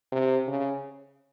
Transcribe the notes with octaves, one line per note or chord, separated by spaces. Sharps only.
C3
C#3